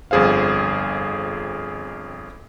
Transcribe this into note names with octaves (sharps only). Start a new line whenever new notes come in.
G1 F2 G#4 C5 F5